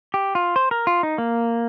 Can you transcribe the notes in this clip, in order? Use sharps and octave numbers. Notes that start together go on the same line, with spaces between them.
G4
F4
C5
A#4
F4
D#4
A#3